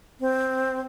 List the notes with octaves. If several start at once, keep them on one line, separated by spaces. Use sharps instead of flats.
C4